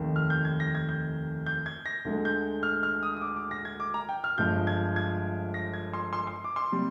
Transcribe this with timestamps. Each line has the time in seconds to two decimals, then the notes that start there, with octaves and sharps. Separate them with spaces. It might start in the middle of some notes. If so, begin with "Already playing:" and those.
Already playing: F1 D#2 D#3
0.16 F6
0.30 G6
0.45 G#6
0.60 A#6
0.75 G#6
0.89 G6
1.46 G6
1.66 G#6
1.86 A#6
2.05 D2 D3 G#3
2.25 G6
2.63 F6
2.83 F6
3.03 D#6
3.17 D#6
3.22 D6
3.36 D6
3.51 A#6
3.65 G#6
3.80 D6
3.94 A#5
4.09 G5
4.24 F6
4.38 G1 G2 F3 G#3 G6
4.67 G#6
4.96 G#6
5.54 A#6
5.73 G#6
5.93 C6
6.13 C6
6.27 C6
6.44 D6
6.56 C6
6.72 C3 G3